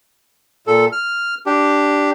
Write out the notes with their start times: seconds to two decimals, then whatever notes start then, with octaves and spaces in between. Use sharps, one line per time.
0.67 A#2 A4
0.92 F6
1.46 D4 G4